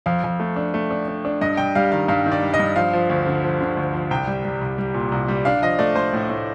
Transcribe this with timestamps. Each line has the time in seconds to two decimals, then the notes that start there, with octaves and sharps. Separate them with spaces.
0.06 F2 F5
0.24 F2
0.40 A3
0.56 D4
0.74 A3
0.91 D4
1.08 D4
1.25 D4
1.41 G2 D#5
1.57 G2 G5
1.75 G3 F5
1.92 D#3 F5
2.08 G2 F5
2.26 D#3
2.32 D5
2.42 G3
2.54 D#5
2.60 G2
2.76 F3 F5
2.93 F3
3.10 D2
3.27 D3
3.43 F3
3.61 D3
3.77 D2
3.94 F3
4.11 C2 G5
4.27 G3
4.45 G3
4.61 C2
4.78 G3
4.94 A#2
5.12 C2
5.28 G3
5.45 D4 F5
5.62 F3 D#5
5.79 A3 D5
5.96 A3 C5
6.13 A2
6.29 A2